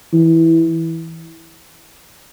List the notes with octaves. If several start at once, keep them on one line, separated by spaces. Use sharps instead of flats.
E3